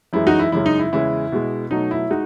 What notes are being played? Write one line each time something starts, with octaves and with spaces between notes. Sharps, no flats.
F#2 E3 G#3 E4
D#4 F#4
E4
F#2 C#3 G#3 E4
D#4
E4
E2 C#3 E3 G#3 E4
B2 G#3
B2 F#3 A3 D#4
E4
G#3 D#4 F#4